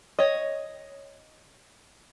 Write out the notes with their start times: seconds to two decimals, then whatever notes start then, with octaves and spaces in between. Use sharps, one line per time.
0.19 C#5 D#5